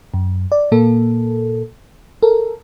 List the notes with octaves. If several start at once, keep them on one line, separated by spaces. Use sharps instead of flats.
F#2
D5
A#2 A#3 A4
A4 A#4